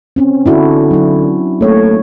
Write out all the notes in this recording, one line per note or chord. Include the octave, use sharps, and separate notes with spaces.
C4 C#4
D3 D4 E4 F#4
F#3 E4
A3 A#3 C#5